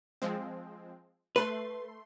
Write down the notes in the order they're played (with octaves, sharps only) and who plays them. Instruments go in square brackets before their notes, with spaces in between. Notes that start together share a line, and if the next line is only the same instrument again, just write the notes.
[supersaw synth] F3 G#3 C4
[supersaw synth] A3 C6 [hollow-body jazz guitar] B4